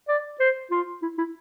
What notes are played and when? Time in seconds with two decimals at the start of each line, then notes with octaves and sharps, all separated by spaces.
0.08 D5
0.40 C5
0.71 F4
1.02 E4
1.18 E4